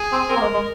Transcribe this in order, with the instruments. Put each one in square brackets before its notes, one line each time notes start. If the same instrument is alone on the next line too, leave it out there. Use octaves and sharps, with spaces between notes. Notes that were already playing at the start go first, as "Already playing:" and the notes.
Already playing: [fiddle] G#4
[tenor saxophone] C4
[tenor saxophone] C4 [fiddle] A#4
[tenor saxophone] A#3
G#3
G#3